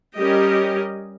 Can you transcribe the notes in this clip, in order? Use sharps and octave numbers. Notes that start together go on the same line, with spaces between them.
G3 C#4 G4 A#4 D#5